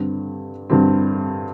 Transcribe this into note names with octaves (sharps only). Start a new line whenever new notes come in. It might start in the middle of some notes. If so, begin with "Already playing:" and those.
Already playing: G2 D3 G3 C4
G2 D3 G3 C4